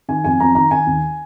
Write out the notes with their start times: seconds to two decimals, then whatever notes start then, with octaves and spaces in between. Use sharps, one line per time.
0.08 D#3 G#5
0.24 F2 G#5
0.40 F2 A#5
0.55 D#3 A#5
0.71 D#3 G#5
0.87 D#2